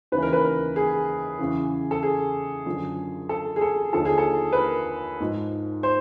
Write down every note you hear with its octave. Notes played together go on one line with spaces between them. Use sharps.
D#2 C#3 E3 B4
A#4
B4
A#4
G#4
E2 C#3 E3
A4
G#4
F#2 D3 F3
A4
G#4
A4
D#2 D3 F3 A4
G#4
A4
B4
A#4
G#2 F3
C5